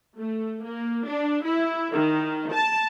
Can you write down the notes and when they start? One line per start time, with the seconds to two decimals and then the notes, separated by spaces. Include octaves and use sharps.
0.18 A3
0.65 A#3
1.07 D4
1.45 E4
1.93 D#3
2.51 A5